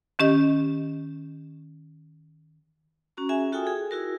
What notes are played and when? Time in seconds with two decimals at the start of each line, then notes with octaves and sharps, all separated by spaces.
0.19 D#3 C#4 G4 D#5
3.17 C#4 F#4 A#5
3.29 C#4 F#4 G#4 E5 G#5
3.52 F4 F#4 A4 G5 G#5 D#6
3.67 G#4
3.91 E4 F#4 A#4